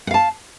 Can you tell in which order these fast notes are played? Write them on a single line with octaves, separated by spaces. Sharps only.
F#5 F5 A5